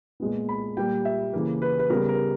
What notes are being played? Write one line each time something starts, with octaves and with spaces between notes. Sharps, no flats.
A#2 G#3 B3
B5
A#2 G3 A#3 G5
E5
C#3 E3 A#3
B4
B4
C#3 G3 B3 A#4
A#4